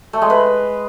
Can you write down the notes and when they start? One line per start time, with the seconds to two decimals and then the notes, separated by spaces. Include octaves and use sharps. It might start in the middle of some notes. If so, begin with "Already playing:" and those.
0.13 A3
0.22 G#3
0.30 B4